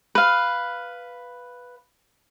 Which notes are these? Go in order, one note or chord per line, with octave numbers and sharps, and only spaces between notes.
B4 F5